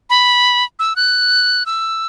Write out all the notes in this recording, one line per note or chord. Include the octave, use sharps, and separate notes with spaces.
B5
E6
F#6
E6